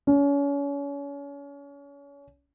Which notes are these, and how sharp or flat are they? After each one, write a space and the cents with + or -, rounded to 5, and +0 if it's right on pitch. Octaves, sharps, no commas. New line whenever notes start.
C#4 +35